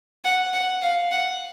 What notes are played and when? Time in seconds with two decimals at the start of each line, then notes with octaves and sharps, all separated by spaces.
0.25 F#5
0.53 F#5
0.82 F5
1.11 F#5